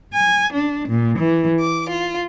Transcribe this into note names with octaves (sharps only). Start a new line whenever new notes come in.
G#5
D4
A#2
E3
D6
F4